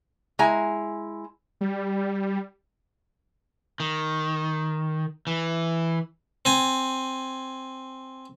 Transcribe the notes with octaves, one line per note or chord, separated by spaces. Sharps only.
G#3 E4 G#5 A#5
G3
D#3
E3
C4 G#5